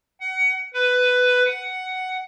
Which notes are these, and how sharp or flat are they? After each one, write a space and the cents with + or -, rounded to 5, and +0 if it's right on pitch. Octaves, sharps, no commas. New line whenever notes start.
F#5 +25
B4 +10
F#5 +10